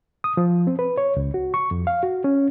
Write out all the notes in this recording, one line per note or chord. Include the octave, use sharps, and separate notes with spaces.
D#6
F3
C4
B4
C#5
C#2
F#4
C#6
F2
F5
F#4
C#4